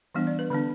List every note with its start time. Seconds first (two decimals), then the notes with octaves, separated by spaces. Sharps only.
0.15 E3 G3 B3 D4
0.27 D5
0.39 B4
0.50 D3 B3 D4 B4